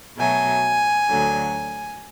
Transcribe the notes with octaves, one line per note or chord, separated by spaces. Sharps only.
B2 F#3 A3 G#5
D2 D3 F#3